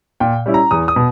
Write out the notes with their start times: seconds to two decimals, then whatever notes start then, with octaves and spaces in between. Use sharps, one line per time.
0.20 A#2 G5
0.46 G3 C#4 E4
0.54 A#5
0.71 E2 D#6
0.88 D#6
0.96 B2